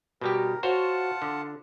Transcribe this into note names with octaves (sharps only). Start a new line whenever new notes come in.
B2 G3 G4 A#4
F4 F#4 C5 C#5 F#5 A5
D3